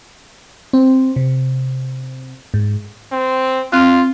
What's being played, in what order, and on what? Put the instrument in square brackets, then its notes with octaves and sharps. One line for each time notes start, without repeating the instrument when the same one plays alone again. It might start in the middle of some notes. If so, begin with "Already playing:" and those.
[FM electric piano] C4
C3
G#2
[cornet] C4
[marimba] C4 F6 F#6 [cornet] F4